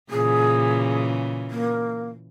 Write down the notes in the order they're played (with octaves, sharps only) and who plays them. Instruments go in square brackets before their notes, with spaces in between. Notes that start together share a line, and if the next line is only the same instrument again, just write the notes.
[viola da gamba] A#2 C#3 E3 [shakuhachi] G#4
[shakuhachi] A#3